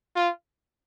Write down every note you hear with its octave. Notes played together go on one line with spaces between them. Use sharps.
F4